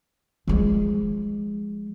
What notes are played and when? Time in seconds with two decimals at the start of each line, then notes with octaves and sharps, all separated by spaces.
0.47 F3 G#3